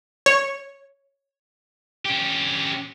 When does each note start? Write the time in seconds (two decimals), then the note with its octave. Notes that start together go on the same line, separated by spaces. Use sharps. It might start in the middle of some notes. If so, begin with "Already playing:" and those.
0.26 C#5
2.05 C#4 G4